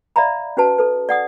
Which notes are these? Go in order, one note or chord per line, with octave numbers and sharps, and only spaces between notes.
D5 E5 F5 A#5 B5
C#4 F#4 B4 A5
A4 B4
D5 F#5 D#6